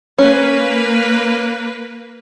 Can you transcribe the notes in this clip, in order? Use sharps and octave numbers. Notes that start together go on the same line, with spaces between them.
A#3 C#4 B4